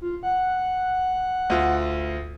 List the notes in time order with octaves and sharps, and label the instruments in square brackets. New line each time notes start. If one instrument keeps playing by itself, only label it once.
[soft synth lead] F4
F#5
[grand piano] D2 F4